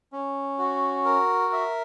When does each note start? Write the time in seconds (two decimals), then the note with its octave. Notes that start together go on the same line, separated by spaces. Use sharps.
0.13 C#4
0.59 F#4
1.05 A#4
1.53 E5